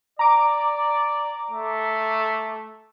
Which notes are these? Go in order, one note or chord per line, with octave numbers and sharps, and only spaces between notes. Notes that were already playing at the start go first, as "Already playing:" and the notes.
D5 A#5 D6
A3